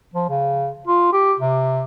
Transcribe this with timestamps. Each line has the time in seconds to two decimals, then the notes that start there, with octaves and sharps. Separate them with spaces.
0.14 F3
0.29 C#3
0.87 F4
1.13 G4
1.40 C3